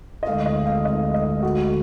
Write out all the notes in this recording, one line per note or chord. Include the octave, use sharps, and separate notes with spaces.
D#5
D2 D3 G#3 F5
D#5
F5
D#5
D#5
F#4